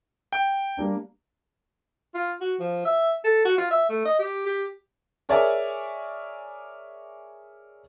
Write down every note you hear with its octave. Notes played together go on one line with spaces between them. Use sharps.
G5
G3 A#3 D4
F4
F#4
F3
E5
A4
F#4
F4
E5
A3
D#5
G4
G4
G#4 A#4 C#5 D5 E5 G#5